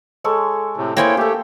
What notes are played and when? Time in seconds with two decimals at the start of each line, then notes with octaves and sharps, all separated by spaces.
0.24 G#3 A4 C#5
0.76 A2 C3
0.97 A#3 E4 F4 G#4 A#4 C5 C#5 G5
1.17 A3 G4 A4 G5